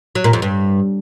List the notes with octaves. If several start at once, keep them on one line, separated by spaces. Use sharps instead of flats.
F#3
A#2
F2
G2